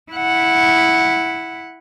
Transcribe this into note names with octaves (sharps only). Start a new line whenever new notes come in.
E4 F#5